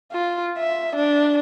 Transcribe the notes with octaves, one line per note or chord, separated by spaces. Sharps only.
F4
E5
D4